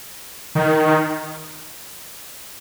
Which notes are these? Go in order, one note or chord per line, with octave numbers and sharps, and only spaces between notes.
D#3